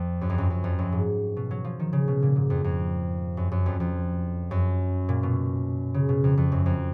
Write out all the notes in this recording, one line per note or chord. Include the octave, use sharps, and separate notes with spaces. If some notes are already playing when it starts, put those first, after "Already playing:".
Already playing: F2
F#2
F2
F#2
F#2
F2
F#2
G#2
B2
F#3
F3
D#3
C#3
B2
A#2
G#2
F2
F2
F#2
F#2
F2
F2
F#2
A#2
B2
C#3
B2
F2
F2
F#2
F2